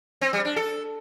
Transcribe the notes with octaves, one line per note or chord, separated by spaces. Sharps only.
C4
G3
D4
A4